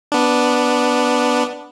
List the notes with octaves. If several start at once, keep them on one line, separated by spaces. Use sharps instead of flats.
B3 D4